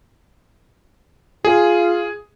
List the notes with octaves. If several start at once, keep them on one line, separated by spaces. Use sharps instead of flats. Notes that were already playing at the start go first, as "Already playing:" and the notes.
F4 G#4